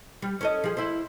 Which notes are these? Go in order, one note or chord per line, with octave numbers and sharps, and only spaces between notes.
G3
C#4 A4 D#5
F3 G#4
E4 C5